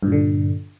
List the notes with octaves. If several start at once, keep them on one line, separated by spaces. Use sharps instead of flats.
G2 A#2 D3